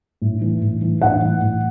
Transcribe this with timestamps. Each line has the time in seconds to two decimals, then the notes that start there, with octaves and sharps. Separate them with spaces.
0.21 A2
0.41 E3
0.61 A2
0.81 E3
1.01 A2 F#5
1.21 E3
1.41 A2